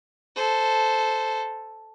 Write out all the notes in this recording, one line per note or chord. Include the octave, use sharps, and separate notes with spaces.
A4 C5